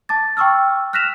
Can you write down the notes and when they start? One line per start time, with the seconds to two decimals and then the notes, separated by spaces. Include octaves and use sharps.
0.09 A5 D6 A6
0.37 G5 C#6 D6 E6 F6
0.93 F6 F#6 A#6 B6 E7 F7